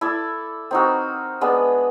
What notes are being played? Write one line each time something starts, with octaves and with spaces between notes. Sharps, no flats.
E4 A4 D5
C4 D#4 F#4 A#4
G#3 B3 D4